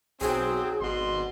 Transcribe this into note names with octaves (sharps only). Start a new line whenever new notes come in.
B1 F#3 C4 G#4
G#1 B2 C6